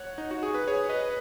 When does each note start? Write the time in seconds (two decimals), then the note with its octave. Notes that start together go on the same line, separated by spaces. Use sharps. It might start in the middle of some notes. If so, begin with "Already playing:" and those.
Already playing: C#5 F#5
0.18 D#4
0.31 F#4
0.43 G#4
0.55 B4
0.68 G#4 C#5
0.89 B4 D#5